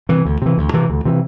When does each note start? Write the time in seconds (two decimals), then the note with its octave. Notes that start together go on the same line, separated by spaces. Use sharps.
0.09 C3 E3
0.25 D2
0.42 C3 E3
0.58 D2
0.74 C3 E3
0.90 D2
1.05 C3 E3